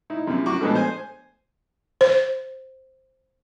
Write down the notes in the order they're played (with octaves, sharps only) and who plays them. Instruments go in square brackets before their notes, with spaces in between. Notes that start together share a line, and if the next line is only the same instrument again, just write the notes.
[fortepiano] D#4 E4
F#2 C3 E4
F#2 F#4 C#6 D6
B2 F3 G#3 B3 D4 A4
C5 G#5
[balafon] C5